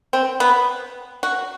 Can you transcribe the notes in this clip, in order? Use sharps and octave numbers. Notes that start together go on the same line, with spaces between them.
C4
B3
F#4